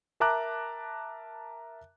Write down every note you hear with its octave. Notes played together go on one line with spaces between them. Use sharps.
A#4 E5 A5 A#5 D6 F#6